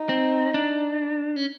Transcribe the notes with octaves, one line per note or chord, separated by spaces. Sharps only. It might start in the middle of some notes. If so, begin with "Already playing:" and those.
Already playing: D#4
C4
D4
C#4